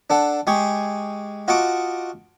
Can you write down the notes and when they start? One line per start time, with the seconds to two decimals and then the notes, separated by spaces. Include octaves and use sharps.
0.10 D4 A4 F#5
0.47 G#3 G4 G#4 C#6
1.48 F4 F#4 D#5 A5 C#6 D6